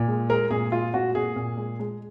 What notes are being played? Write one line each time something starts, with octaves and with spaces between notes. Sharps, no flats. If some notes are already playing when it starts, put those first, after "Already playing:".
Already playing: A#2
G#3
G#3 A#4
A#2 G#4
G#3 F4
A#2 F#4
A#2 G#4
A#2
G#3
G#3